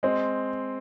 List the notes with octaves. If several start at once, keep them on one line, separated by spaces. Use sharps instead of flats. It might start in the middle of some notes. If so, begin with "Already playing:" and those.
G#3 C4